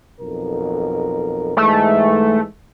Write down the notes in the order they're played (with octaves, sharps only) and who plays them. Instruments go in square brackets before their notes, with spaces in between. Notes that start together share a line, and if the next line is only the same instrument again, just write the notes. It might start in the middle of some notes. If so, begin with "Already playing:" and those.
[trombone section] B1 F2 A#4
[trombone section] G#2 E3 G#3 [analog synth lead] A3